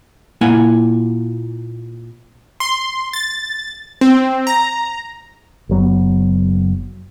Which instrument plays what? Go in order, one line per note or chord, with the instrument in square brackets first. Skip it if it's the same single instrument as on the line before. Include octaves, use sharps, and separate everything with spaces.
[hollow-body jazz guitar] A#2 A#3 E4 F#5 G#5
[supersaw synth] C6
A6
C4
A#5
[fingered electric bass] F#1 F#3 B3